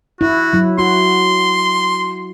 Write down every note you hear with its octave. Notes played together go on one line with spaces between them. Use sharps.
E4 F#4
F#3 E4
F#4 C6